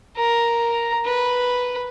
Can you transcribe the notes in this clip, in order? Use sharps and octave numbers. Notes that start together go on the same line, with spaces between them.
A#4 A#5
B4